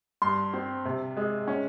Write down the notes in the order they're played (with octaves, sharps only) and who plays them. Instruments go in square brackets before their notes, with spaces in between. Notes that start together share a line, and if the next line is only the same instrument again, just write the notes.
[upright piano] G2 C6
C4
C3
G#3
C#4